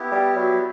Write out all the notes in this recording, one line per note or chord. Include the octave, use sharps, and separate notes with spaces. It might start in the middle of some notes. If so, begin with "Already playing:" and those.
Already playing: B3 E4 G4
G3
F#3